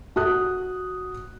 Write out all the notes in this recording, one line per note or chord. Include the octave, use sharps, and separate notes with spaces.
F#4 D#6 F#6